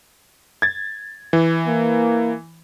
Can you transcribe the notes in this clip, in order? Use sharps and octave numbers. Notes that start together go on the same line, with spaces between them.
G#6 A6
E3
A#3